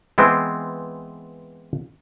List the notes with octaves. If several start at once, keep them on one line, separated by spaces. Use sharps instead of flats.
E3 G#3 B3 C4